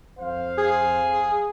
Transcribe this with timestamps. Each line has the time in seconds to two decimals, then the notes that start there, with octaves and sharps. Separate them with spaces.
0.19 F2 C5 F5
0.58 G#4